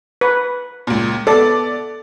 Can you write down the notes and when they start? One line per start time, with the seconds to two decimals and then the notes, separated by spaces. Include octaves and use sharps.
0.21 B4
0.87 C#2 A#2
1.27 B3 A4 D5